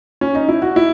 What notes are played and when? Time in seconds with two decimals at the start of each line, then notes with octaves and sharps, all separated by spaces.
0.21 C#4
0.35 D#4
0.49 E4
0.62 F#4
0.76 E4